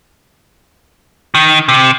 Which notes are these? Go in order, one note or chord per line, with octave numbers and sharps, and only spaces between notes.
D#3
C3